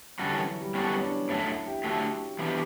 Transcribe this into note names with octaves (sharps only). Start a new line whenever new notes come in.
D3 G3 C#4 F#4 A4
E3
F#3
G3
G3 B3 C#4 F#4 A4
C#4
D4
A2 F#3 A3 C#4
E4
G4
D3 F#3 A3 F#4
E3 B3 D4 G4